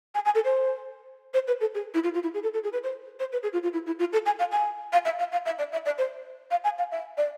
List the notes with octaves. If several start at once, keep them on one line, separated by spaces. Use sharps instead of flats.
G#5
G#5
A4
C5
C5
B4
A4
G#4
E4
F4
F4
E4
G#4
A4
A4
G#4
B4
C5
C5
B4
G#4
F4
F4
E4
E4
F4
A4
G#5
F5
G#5
F5
E5
F5
F5
E5
D5
E5
D5
C5
F5
G#5
F5
E5
D5